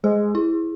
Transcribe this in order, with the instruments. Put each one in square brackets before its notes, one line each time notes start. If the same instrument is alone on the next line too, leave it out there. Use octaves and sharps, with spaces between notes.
[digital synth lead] G#3 [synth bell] G#4
[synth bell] E4